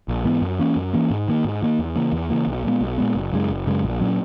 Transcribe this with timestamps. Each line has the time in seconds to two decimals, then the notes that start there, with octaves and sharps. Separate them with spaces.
0.08 A#1
0.24 G#2 E3 B3
0.42 F#2
0.59 E3 A#3 C#4
0.76 F#2
0.93 E3 A#3 C#4
1.11 G#2
1.28 D#3 A#3
1.45 G#2
1.62 D#3 A#3
1.79 E2
1.95 C#3 E3 A#3
2.12 E2
2.30 C#3 E3 A#3
2.47 B1
2.64 A#2 G#3 B3
2.81 B1
2.98 A#2 G#3 B3
3.15 F#1
3.32 F#2 C#3 G#3
3.50 F#1
3.67 F#2 C#3 G#3
3.83 A#1
4.01 A#2 F#3 C#4